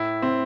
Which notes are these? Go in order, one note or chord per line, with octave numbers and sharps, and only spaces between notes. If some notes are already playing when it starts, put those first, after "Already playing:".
Already playing: A2 E4
C4